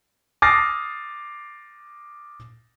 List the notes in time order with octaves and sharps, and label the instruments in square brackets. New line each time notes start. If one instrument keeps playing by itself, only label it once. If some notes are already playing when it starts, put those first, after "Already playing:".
[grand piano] D6 D#6 F6 A6 A#6 C7